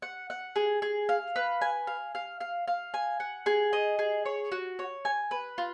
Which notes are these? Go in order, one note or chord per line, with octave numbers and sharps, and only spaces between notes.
F#5
F#5
G#4
G#4
F5
B4
G#5
F5
F5
F5
F5
G#5
F#5
G#4
D#5
G#4
C#5
F#4
C#5
G#5
B4
F4